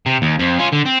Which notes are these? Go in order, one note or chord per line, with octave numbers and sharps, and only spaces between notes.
C3
D#2
F2
C#4 F4
D3
C4